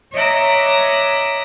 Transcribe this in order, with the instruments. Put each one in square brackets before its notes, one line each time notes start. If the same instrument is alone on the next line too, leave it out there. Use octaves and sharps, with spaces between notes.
[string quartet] C#5 D#5 E5 A#5 D6 F#6